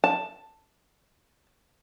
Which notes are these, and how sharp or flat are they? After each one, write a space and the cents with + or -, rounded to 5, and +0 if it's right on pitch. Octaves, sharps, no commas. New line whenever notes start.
A5 +5